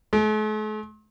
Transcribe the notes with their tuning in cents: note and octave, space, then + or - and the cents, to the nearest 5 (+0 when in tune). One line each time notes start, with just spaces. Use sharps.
A3 -45